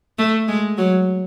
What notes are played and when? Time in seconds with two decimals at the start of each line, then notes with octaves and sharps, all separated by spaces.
0.18 A3
0.48 G#3
0.78 F#3